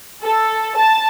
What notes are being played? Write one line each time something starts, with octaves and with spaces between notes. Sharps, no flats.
A4
A5